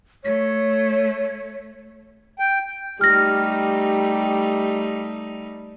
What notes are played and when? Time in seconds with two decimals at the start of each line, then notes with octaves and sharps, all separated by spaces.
0.24 A3 C#5
2.39 G5
3.01 G3 A3 D#4 G4 F6 A#6